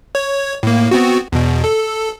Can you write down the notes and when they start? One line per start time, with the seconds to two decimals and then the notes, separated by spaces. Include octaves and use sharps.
0.15 C#5
0.63 A2 A#3
0.91 B3 C4 F#4
1.32 E2 B2
1.64 A4